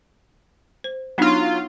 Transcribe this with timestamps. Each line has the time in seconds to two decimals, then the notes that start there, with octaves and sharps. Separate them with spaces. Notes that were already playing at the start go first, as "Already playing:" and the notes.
0.84 C5
1.18 F#3 B3 D4 D#4 F4